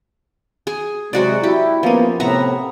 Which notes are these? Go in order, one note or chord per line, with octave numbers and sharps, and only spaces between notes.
G#4
C3 F#3 G#3 F#4 D5
E4 G4
F3 A#3 B3 C#4
A2 C3 B3 E5 F#5 A#5